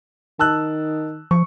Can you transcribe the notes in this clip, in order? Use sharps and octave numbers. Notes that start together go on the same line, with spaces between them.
D#3 A5 E6 F#6
F3 C#6